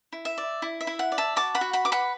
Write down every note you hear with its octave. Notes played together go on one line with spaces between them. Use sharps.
E4
E5
D5
E4
E5
E4
F#5
D5
E5 A5
F#4 A5 D6
F#5 B5
F#4
F#5 B5
B4 D6
F#5 B5